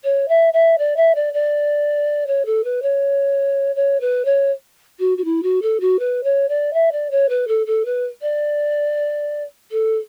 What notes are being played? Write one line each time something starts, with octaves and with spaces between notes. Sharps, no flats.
C#5
E5
E5
D5
E5
D5
D5
C#5
A4
B4
C#5
C#5
B4
C#5
F#4
F#4
E4
F#4
A4
F#4
B4
C#5
D5
E5
D5
C#5
B4
A4
A4
B4
D5
A4